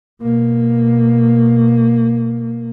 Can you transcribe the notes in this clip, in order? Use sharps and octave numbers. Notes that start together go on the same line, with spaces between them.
B2 A#3